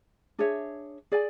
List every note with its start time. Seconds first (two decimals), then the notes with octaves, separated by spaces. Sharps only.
0.39 D4 G#4 C#5 E5
1.12 G#4 D5 G#5